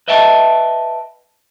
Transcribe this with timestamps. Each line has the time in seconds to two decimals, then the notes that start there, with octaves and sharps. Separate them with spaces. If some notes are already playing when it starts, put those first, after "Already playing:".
0.08 B4 D#5 E5 G5 A5